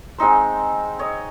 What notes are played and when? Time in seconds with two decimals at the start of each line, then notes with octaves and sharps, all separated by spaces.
0.18 G#3 C4 D#4 C5
0.99 C#5 D#5